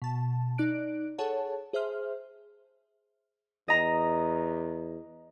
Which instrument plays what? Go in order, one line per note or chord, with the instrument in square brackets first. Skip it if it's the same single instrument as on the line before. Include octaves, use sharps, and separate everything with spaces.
[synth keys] B2 A5
D#4 D5 F#6 D7
G#4 A4 C#5 F#5 A5
G#4 C5 E5 C6 F6
[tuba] E2 [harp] D#5 A#5